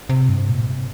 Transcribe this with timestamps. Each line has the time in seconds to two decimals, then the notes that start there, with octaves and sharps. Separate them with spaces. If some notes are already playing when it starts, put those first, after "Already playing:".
0.09 C3
0.29 G2
0.48 A#2
0.67 C3